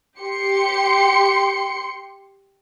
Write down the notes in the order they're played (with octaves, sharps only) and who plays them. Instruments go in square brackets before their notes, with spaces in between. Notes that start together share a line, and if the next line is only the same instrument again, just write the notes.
[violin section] G4 C6 C#7